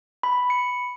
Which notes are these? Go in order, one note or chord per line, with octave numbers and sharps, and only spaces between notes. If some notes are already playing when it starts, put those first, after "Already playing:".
B5
C#7